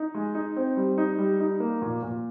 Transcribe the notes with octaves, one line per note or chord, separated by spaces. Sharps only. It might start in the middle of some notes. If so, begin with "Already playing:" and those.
Already playing: D#4
G#3
D#4
C4
G3
D#4
G3
D#4
A#3
A#2
A#2